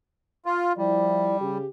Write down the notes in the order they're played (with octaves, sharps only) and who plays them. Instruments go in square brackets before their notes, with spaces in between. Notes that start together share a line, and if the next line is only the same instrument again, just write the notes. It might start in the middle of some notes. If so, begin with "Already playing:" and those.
[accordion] F4
[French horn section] F3 E4 D5 [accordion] G3
[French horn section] C#3 G4